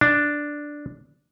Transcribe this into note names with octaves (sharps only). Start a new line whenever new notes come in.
D4